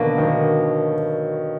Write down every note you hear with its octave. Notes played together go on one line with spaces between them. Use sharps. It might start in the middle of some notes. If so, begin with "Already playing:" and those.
Already playing: B2 D3 D#3 F#3 A#3 D4
D#3